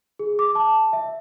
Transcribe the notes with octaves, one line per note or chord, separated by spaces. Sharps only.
G#4
D6
A5
E5